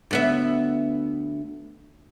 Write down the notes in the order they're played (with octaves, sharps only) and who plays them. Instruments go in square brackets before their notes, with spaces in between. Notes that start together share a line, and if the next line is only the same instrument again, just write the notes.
[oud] D2 B3 E5